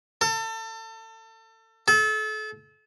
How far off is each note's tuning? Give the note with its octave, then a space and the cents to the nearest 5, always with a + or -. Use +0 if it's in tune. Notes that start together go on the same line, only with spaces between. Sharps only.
A4 +30
A4 -35